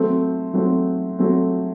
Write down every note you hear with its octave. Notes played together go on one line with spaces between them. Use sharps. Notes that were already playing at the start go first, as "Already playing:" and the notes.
Already playing: F#3 A3 C4
F#3 A3 C4
F#3 A3 C4